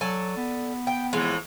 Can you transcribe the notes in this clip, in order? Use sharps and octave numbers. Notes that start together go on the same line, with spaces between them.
F#3 A4 D5 G#5
B3
G5
F2 A2 E3 G#3